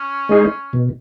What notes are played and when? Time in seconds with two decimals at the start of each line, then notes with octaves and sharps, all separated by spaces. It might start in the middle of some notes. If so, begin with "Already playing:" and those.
Already playing: C#4
0.29 G#3 D#4 G#4
0.73 B2